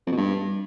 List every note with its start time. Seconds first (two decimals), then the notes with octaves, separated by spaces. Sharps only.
0.07 F2
0.12 B2
0.17 G2